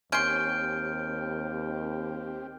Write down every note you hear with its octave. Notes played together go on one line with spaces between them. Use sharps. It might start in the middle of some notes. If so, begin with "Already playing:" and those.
D#2 C4 C#4 G4 C6 F6 G6 D7